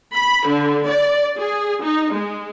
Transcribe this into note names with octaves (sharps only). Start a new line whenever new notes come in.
B5
D3
D5
G#4
D#4
G#3